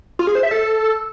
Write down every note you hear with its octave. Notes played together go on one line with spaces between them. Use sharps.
F4
G#4
C5
E5
A4